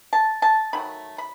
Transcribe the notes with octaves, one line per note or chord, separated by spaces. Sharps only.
A5
A5
D#3 F#3 A3 B5
B5